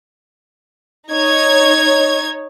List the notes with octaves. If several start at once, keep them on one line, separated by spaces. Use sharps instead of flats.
D#4 C#5 G#6